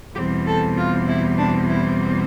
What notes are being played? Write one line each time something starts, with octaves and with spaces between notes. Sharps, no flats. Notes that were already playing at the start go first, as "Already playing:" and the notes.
E2 B2 G3 C4 G4
A4
F4
E4
D4
E4